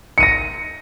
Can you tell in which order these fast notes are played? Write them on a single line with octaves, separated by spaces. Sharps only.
C#7 D#7 A#6